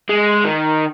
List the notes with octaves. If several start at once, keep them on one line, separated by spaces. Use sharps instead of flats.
G#3
D#3